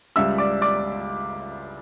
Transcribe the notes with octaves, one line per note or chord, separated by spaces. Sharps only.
C#2 C#3 G3 E5 E6
D5 D6
D5 D6